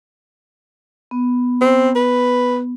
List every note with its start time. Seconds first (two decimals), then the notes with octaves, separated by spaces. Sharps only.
1.11 B3
1.61 C4
1.96 B4